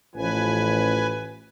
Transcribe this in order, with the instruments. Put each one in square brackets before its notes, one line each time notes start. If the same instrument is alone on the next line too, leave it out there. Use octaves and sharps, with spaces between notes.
[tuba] A1 [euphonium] F3 [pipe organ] B4 G#5